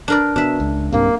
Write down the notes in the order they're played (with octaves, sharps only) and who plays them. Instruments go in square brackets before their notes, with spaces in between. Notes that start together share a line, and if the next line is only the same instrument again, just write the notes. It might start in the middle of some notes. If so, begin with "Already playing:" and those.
[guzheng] D4 A#4 D5
[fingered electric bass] B2 [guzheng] D4 E5
[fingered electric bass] C#2
[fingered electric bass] B1 G2 C3 [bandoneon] A#3